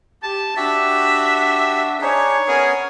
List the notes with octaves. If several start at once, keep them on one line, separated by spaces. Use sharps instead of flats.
G4 A5
D4 F#4 G4 E5 F#5
D4 D#4 G#4 C#5
B3 C#4 G#4 A#4